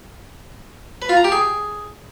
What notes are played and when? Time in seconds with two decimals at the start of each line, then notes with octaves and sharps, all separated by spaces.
1.02 B4
1.09 F4
1.17 A#5
1.24 G4
1.32 G#4